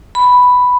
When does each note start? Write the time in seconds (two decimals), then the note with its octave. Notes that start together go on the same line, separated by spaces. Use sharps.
0.15 B5